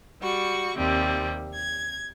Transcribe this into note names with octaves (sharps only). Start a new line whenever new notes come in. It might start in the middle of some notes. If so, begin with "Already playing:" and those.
G3 F#4 C#6
D#2 C3 G3 C4
G#6